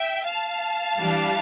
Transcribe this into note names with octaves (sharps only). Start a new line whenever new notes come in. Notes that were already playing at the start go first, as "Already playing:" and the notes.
Already playing: E5 G5
F5 A5
E3 G3 D4